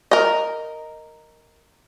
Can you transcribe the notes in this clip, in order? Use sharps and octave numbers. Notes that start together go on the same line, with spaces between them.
A#4 D#5